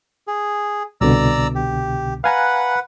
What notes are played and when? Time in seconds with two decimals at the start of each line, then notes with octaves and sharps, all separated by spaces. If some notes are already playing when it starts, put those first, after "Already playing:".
0.28 G#4
1.01 C2 B2 D3 D5 A#5 E6
1.55 G4
2.24 B4 F5 F#5 G#5 A#5